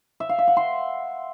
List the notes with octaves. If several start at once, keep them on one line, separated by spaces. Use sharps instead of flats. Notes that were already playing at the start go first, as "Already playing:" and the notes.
E5
F5
E5
F#5
C6